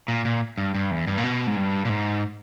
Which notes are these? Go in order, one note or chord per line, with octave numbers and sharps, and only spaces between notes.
A#2
A#2
G2
G2
E2
G2
A#2
B2
G#2
G2
A#2
G#2